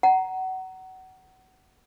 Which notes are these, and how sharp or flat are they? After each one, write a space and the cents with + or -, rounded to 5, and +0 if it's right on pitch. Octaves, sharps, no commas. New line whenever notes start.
F#5 +25 A#5 +0